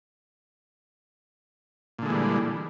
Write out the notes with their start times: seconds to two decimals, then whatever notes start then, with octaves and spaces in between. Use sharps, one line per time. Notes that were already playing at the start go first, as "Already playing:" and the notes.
1.99 A#2
2.02 D3
2.06 G#3
2.09 E3
2.12 G3